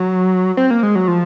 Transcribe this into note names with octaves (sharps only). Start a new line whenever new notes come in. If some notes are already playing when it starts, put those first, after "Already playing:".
Already playing: F#3
C4
A#3
G#3
F#3
F3